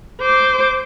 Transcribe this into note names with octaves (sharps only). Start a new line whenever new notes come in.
C5 D6